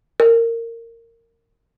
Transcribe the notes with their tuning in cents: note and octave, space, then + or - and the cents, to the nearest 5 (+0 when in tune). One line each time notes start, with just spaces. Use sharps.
A#4 -20